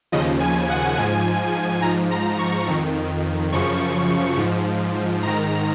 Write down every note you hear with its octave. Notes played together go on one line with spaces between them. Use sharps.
D#2 C#3 F3 D#5
G#5
F#5
G#2 F3 G#5
G#2 F3 A#5
A#5
C#6
F2 D#3
F#2 C#3 F3 C#6
G#2 F3
G#2 D#3 A#5